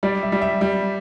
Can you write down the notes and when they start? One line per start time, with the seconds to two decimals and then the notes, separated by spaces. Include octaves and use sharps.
0.03 G3 D5
0.23 E5
0.32 G3
0.42 E5
0.61 G3